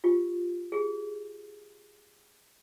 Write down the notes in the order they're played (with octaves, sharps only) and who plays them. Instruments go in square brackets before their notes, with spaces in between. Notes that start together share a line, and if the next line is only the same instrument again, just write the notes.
[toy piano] F4 G4
G4 G#4